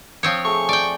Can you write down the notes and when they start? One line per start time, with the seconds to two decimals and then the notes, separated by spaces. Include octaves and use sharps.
0.23 F3 C4 C#5 D#6
0.45 A3 G#4 C#6
0.69 D5 G5